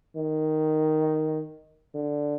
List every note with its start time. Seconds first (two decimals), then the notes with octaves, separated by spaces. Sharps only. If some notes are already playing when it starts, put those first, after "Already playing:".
0.16 D#3
1.95 D3